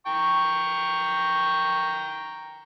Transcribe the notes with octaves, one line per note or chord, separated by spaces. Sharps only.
G5 A#5 C#6